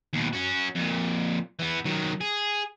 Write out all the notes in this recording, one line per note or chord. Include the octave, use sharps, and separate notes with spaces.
D#2 B2
C#4 F#4
F2 A#2
E3 B3
D#3 F#3
G#4